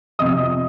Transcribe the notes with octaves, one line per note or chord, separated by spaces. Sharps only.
F2 C3 F3 D#5 D#6